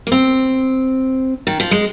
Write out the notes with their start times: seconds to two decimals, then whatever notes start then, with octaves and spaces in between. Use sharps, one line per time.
0.07 A#3
0.12 C4
1.47 D#3
1.60 F3
1.71 G#3